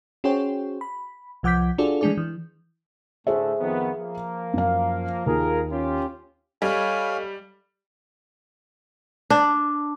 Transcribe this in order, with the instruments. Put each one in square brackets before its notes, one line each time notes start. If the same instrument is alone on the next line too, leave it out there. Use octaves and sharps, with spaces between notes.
[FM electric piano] C#4 F#4 G#4 C5 C#5 G5
B5
C2 F3 F#5 D6 G6 B6
D4 F4 F#4 G#4 A4 D5
E3 G#3 A3 D4 G#4 D5
E3
[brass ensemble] A2 D3 A3 [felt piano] G#4 C5 E5
[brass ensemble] F2 D#3 B3
F3 A#3
[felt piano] F#2 F5
[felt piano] D#2 [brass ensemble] F4 G#4 A#4
[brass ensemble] C#4 F4 G4
[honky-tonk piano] G3 [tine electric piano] A4 D#5 [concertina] C#5 F5 G#5
[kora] D4